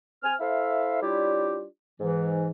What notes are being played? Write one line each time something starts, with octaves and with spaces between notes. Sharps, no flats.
C4 G#5 F6
E4 A4 C5 E5 F5
G3 C#4 D4 E4 F4 G4
G#2 E3